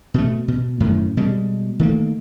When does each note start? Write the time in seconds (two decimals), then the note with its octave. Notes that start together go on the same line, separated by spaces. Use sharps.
0.14 B2 A3
0.48 B2
0.80 F#2 A2 D#3
1.17 B2 G3 G#3
1.79 D#3 A3 A#3